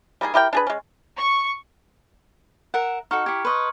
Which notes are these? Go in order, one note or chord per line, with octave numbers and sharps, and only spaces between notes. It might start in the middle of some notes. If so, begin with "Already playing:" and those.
G3 A#3 D#4 G#4
E4 G4 A#4 G5
D4 G#4 B4
G#3 C#4
C#6
A#4 E5 F#5
D#4 F#4 A4 A#5 C#6 F6
E4 G4 G#6 C#7
B4 D#5 C6 C#6